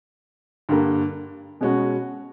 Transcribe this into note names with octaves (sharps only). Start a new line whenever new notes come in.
G2 D3 G3 A#3
B2 G#3 C#4 F#4